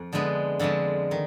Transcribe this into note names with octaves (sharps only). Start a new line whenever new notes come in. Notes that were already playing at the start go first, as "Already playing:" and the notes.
Already playing: F2
D3 F3 G#3 B3
F2 D3 F3 G#3
D#3